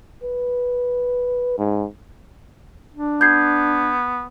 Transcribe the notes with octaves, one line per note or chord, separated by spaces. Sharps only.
B4
G#2
D4
B3 G6 G#6 C7